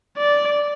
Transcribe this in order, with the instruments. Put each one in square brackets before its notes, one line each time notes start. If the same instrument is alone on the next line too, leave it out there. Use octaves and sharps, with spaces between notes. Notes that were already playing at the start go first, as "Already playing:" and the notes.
[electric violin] D5